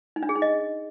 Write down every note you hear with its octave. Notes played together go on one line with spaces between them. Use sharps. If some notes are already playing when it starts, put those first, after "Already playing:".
D#4
D4
G#4
D#4
D#5